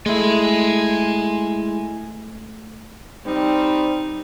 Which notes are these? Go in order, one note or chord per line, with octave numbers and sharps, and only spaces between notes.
G#3 A3 E4 G#5 C6
G3 C4 D#4